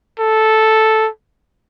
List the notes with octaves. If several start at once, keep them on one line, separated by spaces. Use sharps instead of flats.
A4